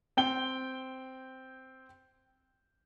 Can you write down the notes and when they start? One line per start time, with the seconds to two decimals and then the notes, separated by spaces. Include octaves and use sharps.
0.17 C4 G5 G7